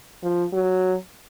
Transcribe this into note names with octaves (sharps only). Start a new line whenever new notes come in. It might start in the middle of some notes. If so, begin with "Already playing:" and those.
F3
F#3